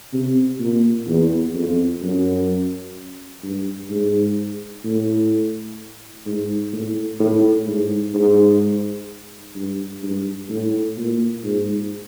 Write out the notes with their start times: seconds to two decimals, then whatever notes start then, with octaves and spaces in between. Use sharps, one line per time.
0.13 C3
0.60 A#2
1.07 E2
1.55 F2
2.02 F#2
3.43 G2
3.90 G#2
4.85 A2
6.26 G#2
6.73 A2
7.20 A2
7.67 G#2
8.14 G#2
9.55 G2
10.03 G2
10.49 A2
10.97 A#2
11.44 G#2